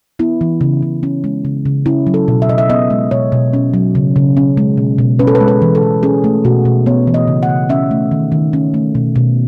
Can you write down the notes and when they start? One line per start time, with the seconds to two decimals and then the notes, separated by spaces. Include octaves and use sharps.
0.19 B3 E4
0.41 E3
0.61 C#3
0.83 C#3
1.03 C#4
1.24 G#3
1.45 C#3
1.66 C#3
1.86 C#4 E4
2.07 F#3
2.14 A4
2.28 B2
2.42 E5
2.49 B2 D#5
2.58 E5
2.69 B3 D#5
2.90 G#3
3.11 B2 C#5
3.32 B2
3.53 C#4
3.74 F#3
3.95 C#3
4.16 C#3
4.37 C#4
4.57 G#3
4.77 B2
4.98 B2
5.19 C#4 B4
5.27 A4
5.35 B4
5.40 G#3
5.48 B4
5.62 E3
5.75 A4
5.83 E3
6.03 C#4 G#4
6.24 A3
6.45 B2 F#4
6.65 B2
6.86 B3 C#5
7.07 E3
7.14 D#5
7.28 C#3
7.43 F#5
7.49 C#3
7.69 C#4 E5
7.91 A3
8.11 D#3
8.32 D#3
8.53 C#4
8.74 A3
8.95 B2
9.16 B2